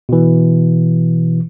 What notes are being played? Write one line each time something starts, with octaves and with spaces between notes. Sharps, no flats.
B2 E3